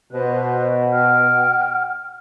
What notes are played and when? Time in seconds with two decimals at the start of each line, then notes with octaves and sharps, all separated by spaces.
0.13 B2 C5 F#6
0.93 F#5 G5 F6